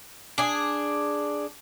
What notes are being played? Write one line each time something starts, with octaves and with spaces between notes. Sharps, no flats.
D4 G#4